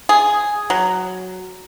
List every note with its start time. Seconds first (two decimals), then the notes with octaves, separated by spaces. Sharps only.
0.09 G#4
0.70 F#3